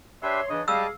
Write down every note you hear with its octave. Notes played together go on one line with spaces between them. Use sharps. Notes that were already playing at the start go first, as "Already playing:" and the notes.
D4 G4 B4 C#5 E5 C6
C#3 E3 D4 C#5 D#5
G3 G#4 D#5 F5 A5 D6 E6